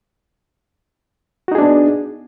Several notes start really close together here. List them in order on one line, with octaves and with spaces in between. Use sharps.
F#4 D#4 G#4 D4 B3